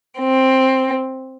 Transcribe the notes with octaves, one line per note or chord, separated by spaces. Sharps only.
C4